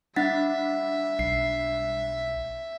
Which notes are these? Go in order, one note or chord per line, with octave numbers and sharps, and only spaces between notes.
G3 D4 E5 F#5 A6 B6
B1 C7